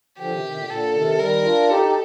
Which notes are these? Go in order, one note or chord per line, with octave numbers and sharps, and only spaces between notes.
D3 F3 G4
C3 D#3
C3 D#3
A#2 D3
A#2 D3 A4
C3 D#3
D#3 G3 A#4
D4 F4
D#4 G4 A4
G4